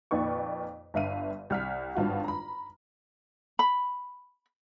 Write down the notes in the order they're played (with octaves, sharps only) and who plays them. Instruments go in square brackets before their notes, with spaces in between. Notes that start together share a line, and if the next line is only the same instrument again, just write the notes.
[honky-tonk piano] F2 A#2 D#3 B4 D5 C#6
G1 G2 E5 F5 D#7
C2 F6 B6
G#1 G2 F4 F#4
A#5 B5
[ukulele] B5